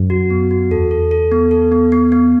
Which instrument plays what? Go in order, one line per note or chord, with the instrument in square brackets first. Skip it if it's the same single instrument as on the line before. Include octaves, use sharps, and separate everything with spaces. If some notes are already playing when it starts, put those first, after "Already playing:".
Already playing: [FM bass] F#2
[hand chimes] F#4
B3
F#4
[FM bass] E2 [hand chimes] A4
[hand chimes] A4
A4
B3
A4
B3
B3
B3